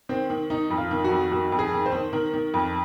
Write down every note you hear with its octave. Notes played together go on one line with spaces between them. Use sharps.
D#3 C4
D#3
D#3 D#4
F2
F4
D#3
F#4
F2
D#3 F#4
F2
G#4
D#3
C5
D#3
D#3 A#4
D#3
F2